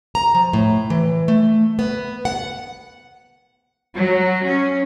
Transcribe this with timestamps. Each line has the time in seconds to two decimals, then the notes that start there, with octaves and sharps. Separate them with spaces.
0.15 A#5
0.34 F3
0.53 A2
0.90 E3
1.28 A3
1.79 B3
2.25 F#5
3.93 F#3
4.45 C#4